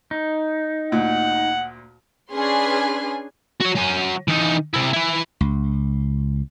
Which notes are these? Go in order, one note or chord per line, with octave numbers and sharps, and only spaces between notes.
D#4
D2 A#2 F#5
C#4 D4 G#4 B4 G#5 C6
F#4 C#5
F#3 G#5
E3 D#4
C3 E4
E3 E4
C#2